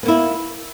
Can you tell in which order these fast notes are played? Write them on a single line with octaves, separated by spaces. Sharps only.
B3 A#3 E4